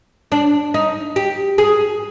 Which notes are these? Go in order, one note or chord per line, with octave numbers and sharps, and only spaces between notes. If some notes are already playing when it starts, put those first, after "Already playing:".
D4
D#4
G4
G#4